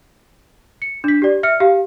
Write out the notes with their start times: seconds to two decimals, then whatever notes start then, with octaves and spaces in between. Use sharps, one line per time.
0.82 C#7
1.04 D4 B6
1.22 G4 D5
1.43 E5 F6 C#7
1.60 G4 F5